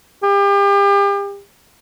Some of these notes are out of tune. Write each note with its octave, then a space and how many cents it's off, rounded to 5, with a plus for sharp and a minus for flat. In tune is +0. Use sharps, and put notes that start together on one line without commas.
G4 +35